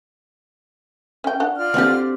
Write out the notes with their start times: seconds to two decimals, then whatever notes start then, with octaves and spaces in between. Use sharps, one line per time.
1.24 C#4 G5
1.40 D4 F#5
1.57 F4 D5 F6
1.74 D3 F#3 C4 G4